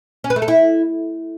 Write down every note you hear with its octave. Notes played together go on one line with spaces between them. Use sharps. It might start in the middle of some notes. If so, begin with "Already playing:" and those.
C#4
B4
A3
A4
E4